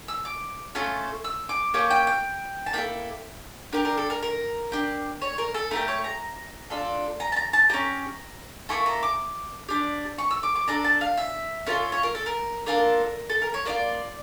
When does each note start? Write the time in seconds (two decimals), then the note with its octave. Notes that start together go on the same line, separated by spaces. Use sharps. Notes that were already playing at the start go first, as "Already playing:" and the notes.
0.08 E6
0.25 D6
0.75 A3 C#4 F4 A4
1.24 E6
1.49 D6
1.74 A#3 C#4 G4 D6
1.90 G5
2.07 G5
2.66 A5
2.73 A#3 E4 A4 G5
3.73 D4 G4 A#4
3.85 A#4
3.98 A4
4.10 A#4
4.23 A#4
4.72 D4 G4
5.22 C#5
5.38 A#4
5.54 A4
5.71 A3 E4 G4 A#4
5.88 C#5
6.04 A#5
6.70 D4 F4 A4
7.20 A#5
7.32 A5
7.36 A#5
7.53 A5
7.69 C#4 G4 A#5
8.69 A#3 E4 A4 C#6
8.86 A#5
9.03 D6
9.69 D4 G4
10.18 C#6
10.31 E6
10.43 D6
10.56 D6
10.68 D4 A4 A#5
10.84 A5
11.01 F5
11.17 E5
11.67 C#4 F4 A4 A#4
11.92 C#5
12.03 A#4
12.15 A4
12.26 A#4
12.66 A#3 D4 F4 A4 A#4
13.29 A4
13.42 A#4
13.54 C#5
13.65 A#3 D4 F4 D5